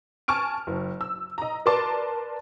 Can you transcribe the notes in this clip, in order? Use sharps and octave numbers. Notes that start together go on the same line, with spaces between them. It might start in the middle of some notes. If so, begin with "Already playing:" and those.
G#5 A5 C#6 F6 D7
F#1
E6
D#5 A#5
A#4 B4 D5 A5 C6 D6